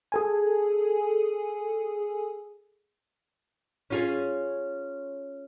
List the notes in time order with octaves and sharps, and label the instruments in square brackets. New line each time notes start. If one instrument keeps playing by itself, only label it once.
[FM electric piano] G#4 A4 G#5
[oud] C#4 F4 G#4